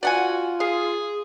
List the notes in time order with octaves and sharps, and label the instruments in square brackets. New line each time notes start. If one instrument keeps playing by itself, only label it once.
[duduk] F4 [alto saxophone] F#4 [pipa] D5 F#5 G#5
[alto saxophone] G#4 [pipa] F5